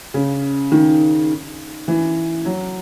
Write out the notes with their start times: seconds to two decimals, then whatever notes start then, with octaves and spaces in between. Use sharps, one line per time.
0.14 C#3
0.72 D#3
1.88 E3
2.45 F#3